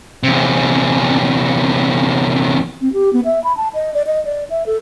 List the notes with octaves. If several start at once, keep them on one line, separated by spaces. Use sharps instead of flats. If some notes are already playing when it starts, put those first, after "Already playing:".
E2 C3
C4
G4
B3
E5
B5
A5
D#5
D5
D#5
D5
E5
A4